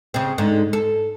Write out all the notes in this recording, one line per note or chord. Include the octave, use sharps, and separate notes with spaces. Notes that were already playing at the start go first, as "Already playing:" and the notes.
C#3 C4
G#2 D3
A4